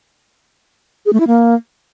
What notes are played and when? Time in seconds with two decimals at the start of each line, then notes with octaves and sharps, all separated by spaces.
1.06 G#4
1.13 A3
1.20 E4
1.27 A#3